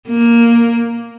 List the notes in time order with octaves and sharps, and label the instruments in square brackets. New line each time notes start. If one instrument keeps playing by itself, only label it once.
[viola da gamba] A#3